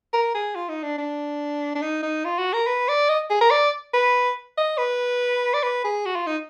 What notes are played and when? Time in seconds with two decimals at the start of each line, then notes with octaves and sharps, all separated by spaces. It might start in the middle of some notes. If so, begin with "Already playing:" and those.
0.13 A#4
0.35 G#4
0.55 F4
0.69 D#4
0.83 D4
0.98 D4
1.75 D4
1.82 D#4
2.03 D#4
2.25 F4
2.38 F#4
2.53 A#4
2.67 B4
2.88 D5
3.09 D#5
3.30 G#4
3.41 A#4
3.51 D5
3.93 B4
4.57 D#5
4.78 B4
5.54 D5
5.63 B4
5.84 G#4
6.06 F#4
6.16 F4
6.27 D#4